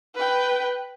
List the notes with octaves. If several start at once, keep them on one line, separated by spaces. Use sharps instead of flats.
B4 G5